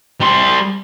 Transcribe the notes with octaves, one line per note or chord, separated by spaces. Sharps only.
G3 C6